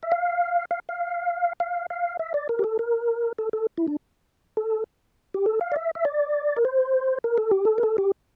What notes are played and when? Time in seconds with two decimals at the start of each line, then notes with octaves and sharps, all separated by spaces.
0.03 E5
0.12 F5
0.71 F5
0.89 F5
1.60 F5
1.90 F5
2.19 E5
2.34 D5
2.49 A#4
2.59 G4
2.64 A4
2.79 A#4
3.39 A4
3.53 A4
3.78 E4
3.88 D4
4.57 A4
5.34 G4
5.46 A4
5.61 F5
5.72 D5
5.76 E5
5.95 E5
6.05 D5
6.57 A#4
6.65 C5
7.24 A#4
7.38 A4
7.51 G4
7.65 A4
7.78 A#4
7.83 A4
7.98 G4